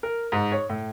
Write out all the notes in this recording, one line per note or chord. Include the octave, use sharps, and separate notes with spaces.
A#4
G#2
C#5
A2